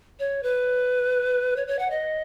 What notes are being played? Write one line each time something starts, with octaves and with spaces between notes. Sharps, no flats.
C#5
B4
C#5
C#5
F#5
D#5